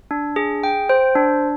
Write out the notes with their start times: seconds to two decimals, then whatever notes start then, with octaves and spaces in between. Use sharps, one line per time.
0.11 D4
0.36 G#4
0.64 G5
0.89 C5
1.15 D4